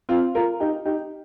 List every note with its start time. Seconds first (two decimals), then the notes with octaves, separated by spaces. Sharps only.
0.09 C4 F4
0.35 F4 A#4
0.60 D#4 G4
0.85 D#4 G4